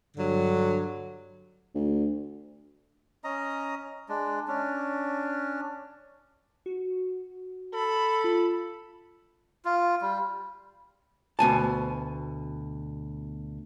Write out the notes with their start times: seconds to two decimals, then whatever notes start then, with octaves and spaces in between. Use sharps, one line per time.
0.16 G2 D3 F#3
1.75 D2
3.24 C#4 D#5 A#5
4.09 G#3 D4
4.48 C#4 D4
6.66 F#4
7.74 A4 B5
8.24 F4
9.65 F4
10.01 G3
11.39 D2 B2 G#5 A5